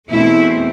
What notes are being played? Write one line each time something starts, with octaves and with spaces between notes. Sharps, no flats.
E2 B2 A3 C4 E4